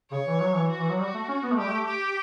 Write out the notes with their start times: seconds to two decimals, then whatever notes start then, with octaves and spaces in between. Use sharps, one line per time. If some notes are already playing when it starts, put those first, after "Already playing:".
0.11 C#3 C#5
0.27 E3
0.40 F#3
0.54 E3
0.71 F#4
0.79 E3
0.89 F#3
0.99 G3 F#4
1.14 A3
1.29 C#4
1.44 B3
1.52 A3
1.58 G3 G4
1.69 A3
1.87 G4